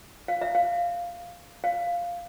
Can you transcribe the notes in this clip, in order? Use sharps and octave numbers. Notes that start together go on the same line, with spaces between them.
F5
E5
F5
F5